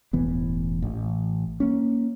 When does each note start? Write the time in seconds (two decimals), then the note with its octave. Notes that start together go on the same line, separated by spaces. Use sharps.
0.13 E1 A1 E3 B3
0.82 A1
1.60 A#3 C#4